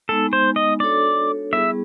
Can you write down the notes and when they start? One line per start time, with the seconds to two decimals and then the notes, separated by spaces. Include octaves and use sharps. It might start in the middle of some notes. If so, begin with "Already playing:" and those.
0.09 G#3 B3 D#4 A4
0.33 C5
0.56 D#5
0.80 D4 F#4 A4 C#5 D5
1.53 G3 B3 E4 G#4 E5